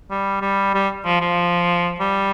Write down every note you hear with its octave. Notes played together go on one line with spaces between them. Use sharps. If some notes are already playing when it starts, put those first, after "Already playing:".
G3
G3
G3
F3
F3
G3